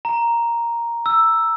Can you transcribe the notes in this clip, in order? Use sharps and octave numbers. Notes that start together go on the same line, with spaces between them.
A#5
E6